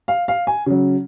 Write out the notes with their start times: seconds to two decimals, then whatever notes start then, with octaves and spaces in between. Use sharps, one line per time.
0.08 F5
0.28 F5
0.47 G#5
0.66 C#3 F#3